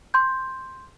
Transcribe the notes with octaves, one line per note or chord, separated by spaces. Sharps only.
C6 G6